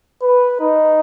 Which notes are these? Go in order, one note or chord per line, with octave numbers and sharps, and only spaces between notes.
B4
D#4